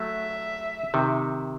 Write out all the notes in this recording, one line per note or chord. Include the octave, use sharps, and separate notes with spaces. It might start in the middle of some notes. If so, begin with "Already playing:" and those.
Already playing: F#3 A3 E5
C3 D#3